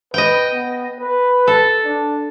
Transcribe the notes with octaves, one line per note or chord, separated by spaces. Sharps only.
B4 D#5 G5
B3
B4
A4
D4